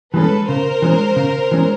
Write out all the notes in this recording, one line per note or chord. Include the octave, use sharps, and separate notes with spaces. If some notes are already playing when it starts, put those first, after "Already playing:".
E3 G#3 C#4 A4 B4
C#3 A#4 C5
E3 G#3 C#4
C#3
E3 G#3 C#4